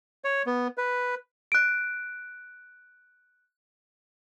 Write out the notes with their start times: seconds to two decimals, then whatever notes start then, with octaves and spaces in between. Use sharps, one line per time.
0.24 C#5
0.46 B3
0.78 B4
1.52 F#6 D7